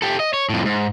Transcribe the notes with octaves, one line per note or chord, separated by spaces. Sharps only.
G4 A4
D#5
C#5
F2 A2
G#2